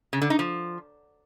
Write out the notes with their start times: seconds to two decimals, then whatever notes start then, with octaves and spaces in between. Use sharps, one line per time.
0.13 C#3
0.22 D3
0.30 D#4
0.39 F3